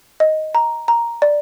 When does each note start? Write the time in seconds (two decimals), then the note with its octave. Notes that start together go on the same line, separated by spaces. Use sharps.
0.20 D#5
0.55 A#5
0.88 A#5
1.22 D5